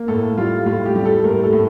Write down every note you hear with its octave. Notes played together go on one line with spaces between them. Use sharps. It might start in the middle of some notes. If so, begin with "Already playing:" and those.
Already playing: A#3
A2 A4
G3 F4
A2 F4
G4
G3
A4
A2 A#4
A4
A2